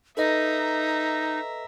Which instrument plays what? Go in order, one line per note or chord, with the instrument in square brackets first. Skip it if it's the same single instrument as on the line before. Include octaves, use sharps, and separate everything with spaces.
[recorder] D#4 [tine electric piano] A4 B4 D#5 [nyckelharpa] E5 A#5